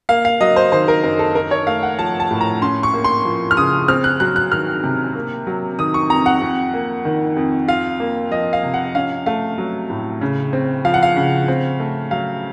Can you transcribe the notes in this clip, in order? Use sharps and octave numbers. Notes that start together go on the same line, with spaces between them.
A#3 F5
F5
F#3 D#5
C5
D#3 C5
A#4
F#2 A#4
A4
D#4 A#4
C#5
A3 F5
F#5
F3 A5
A5
A2
A#5
C#4 C6
C#6
A#3
C6
F3
F6
C#3 D#6
C4 F6
F#6
F#3 F#6
F#6
D#3 F6
C3
A#3
F#3
D#3 D#6
C#6
F2 A#5
F#5
F2
A#3
D#3
F2
F4 F5
A#3
F3 D#5
F5
C3
F#5
C#4 F5
A3 F5
F#3
A2
C#3
C4
F3 F5
F#5
F5
C#3
C4
A3
F#3 F5